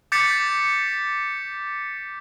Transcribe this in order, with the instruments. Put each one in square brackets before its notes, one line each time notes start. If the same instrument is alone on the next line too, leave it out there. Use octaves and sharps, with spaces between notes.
[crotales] D6 G6 A6 B6 C#7